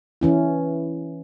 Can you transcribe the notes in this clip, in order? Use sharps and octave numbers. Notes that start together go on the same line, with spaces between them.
E3 C#4 E4